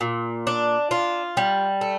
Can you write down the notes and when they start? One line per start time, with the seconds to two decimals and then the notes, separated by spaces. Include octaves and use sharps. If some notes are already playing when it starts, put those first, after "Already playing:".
0.01 A#2
0.47 D4
0.91 F4
1.37 G3
1.81 A3